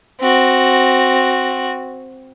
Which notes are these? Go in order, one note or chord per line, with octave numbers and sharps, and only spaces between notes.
C4 F#4